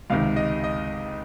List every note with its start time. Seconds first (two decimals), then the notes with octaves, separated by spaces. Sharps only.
0.10 C#2 C3 D#3 F5
0.36 D#5
0.64 D#5